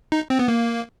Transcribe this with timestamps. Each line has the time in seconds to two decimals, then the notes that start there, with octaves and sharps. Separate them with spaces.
0.12 D#4
0.30 C4
0.39 B3
0.48 A#3